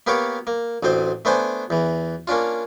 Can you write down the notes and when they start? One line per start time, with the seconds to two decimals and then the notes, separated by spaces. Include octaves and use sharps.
0.07 A#3 B3 G4 A#4 C#5 F5
0.47 A#3
0.83 A1 D2 C4 C5
1.25 A3 B3 D4 C5 G#5
1.70 E2 E3
2.27 A#3 C#4 D4 F4